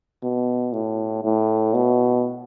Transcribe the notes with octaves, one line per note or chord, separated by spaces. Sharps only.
B2
A2
A2
B2